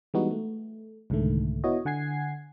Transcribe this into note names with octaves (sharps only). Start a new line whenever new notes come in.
E3 G3 G#3 B3 D#4 F#4
A3
C2 G#2 D3 D#3 A3
B3 E4 F#4 C#5 D#5
D3 F#5 G#5 G#6 C7